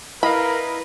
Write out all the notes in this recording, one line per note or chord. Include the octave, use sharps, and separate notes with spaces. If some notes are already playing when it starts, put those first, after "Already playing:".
E4 A#4 B4 D#5 F5 B5